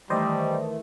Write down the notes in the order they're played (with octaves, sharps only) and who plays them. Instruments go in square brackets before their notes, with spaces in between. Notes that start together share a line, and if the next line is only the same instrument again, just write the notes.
[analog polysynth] D#3 E3 A3 [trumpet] G3 [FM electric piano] C5 D5 D#5